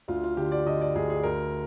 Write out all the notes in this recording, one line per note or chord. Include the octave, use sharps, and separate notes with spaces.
D2 F4
F4
D3 G4
D5
D3 D#5
D5
D2 G#4
G#4
D2 A#4